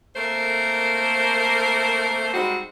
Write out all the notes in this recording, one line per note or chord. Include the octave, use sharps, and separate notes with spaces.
A3 A#3 C4 A#4 C5
G3 G#3 C4 D#4 F#4